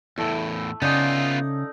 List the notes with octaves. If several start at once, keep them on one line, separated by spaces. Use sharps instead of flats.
E2 A2 A3 E4
C#3 B3 D#4 F4 D5 D#5